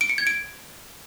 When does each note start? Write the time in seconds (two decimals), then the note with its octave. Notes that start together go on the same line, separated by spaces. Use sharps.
0.01 D7
0.09 C#7
0.18 G#6
0.27 D7